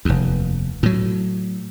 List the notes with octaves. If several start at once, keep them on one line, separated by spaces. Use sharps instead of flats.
F1 D#2
A2 F#3